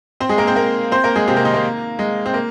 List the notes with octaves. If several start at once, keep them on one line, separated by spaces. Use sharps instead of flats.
C4 C5
G#3 G#4
A#3 A#4
C4 C5
A#3 A#4
C4 C5
A#3 A#4
G#3 G#4
C3 C4
A#3
D#3 D#4
A#3
G#3
C4
A#3